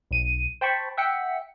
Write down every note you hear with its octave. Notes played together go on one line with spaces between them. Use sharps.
B1 D#7
C5 G5 A5 B5 C#6
E5 F#5 G5 B6 C#7